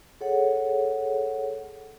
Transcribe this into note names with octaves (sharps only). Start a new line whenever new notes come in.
G#4 A4 C#5 F#5